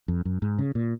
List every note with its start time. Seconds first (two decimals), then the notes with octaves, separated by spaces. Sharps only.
0.08 F2
0.25 F#2
0.42 G#2
0.59 C#3
0.75 A#2